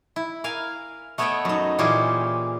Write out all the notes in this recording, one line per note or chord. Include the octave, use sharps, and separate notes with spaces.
E4
A#4 F5 G#5
A3 B3 C#5 D#5 E5 G5
F#2 D#4
A#2 E3 C#4 G4 G#4 C5